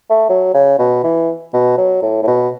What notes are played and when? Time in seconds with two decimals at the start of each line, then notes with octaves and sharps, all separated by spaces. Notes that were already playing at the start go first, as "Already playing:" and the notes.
0.10 A3
0.30 F#3
0.54 C#3
0.79 B2
1.04 E3
1.54 B2
1.78 F#3
2.02 A2
2.23 A2
2.27 B2